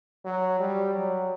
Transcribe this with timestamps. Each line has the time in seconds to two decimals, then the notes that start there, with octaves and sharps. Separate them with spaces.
0.25 F#3
0.59 G3
0.95 F#3